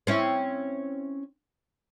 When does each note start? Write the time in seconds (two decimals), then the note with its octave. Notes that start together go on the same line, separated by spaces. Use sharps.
0.07 C4 C#4 E4